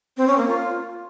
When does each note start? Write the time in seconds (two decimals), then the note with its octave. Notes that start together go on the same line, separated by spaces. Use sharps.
0.17 C4
0.27 C#4
0.37 A#3
0.47 F4